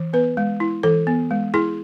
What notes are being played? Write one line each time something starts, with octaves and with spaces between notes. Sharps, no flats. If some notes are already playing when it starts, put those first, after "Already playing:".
Already playing: E3
B3 B4
G#3
E4
E3 A4
B3
G#3
E4 G#4